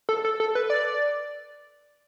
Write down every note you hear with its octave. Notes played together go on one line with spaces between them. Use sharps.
A4
A4
A4
B4
D5